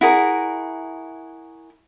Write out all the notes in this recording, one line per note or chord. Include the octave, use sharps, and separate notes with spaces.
E4 F#4 G#4 A#4